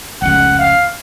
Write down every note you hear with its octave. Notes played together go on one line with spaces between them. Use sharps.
F1 C#2 F#5
F5